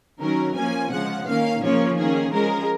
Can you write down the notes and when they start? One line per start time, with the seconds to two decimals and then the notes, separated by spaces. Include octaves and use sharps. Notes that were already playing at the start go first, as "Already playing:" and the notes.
0.20 D#3 F#3 C#4 A#4
0.56 F3 A#3 C#4 G#5
0.91 C#3 F3 G#3 F#5
1.27 D#3 A#3 C#4 F5
1.63 C#3 F3 A#3 C#4 C#5
1.97 D#3 A#3 C#4 G#4
2.33 F3 G#3 C#4 A#4